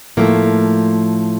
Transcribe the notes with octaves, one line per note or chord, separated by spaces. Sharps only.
A2 F3 A3 A#3